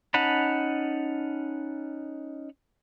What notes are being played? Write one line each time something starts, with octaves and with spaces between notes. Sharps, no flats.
C#4 D#4 F#5 A5 B5